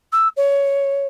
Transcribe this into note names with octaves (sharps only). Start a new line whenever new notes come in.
E6
C#5